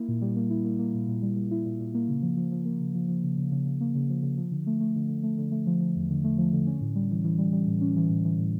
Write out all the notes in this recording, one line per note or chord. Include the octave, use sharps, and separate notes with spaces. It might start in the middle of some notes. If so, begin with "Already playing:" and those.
Already playing: A#3 E4
A#2
G3
A#3
E4
A#3
A#3
A#2
A#2
G3
G3
E4
A#2
A#2
A#3
C#3
F3
F3
F3
A#3
C#3
F3
F3
C#3
C#3
C#3
C#3
A#3
C#3
F3
C#3
F3
D3
A3
A3
D3
D3
A3
D3
A3
F3
F3
E2
D3
A3
F3
D3
C#4
A2
G3
E3
E3
G3
G3
A2
C#4
E3
A2
E3
A2